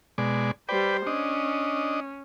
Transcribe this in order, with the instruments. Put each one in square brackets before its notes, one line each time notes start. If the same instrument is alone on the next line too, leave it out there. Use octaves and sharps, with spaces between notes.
[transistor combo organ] B2 G#3 D5
[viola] G3 C5 [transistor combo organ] B4 D5 G5
[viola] C#4 [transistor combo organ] D4 D#5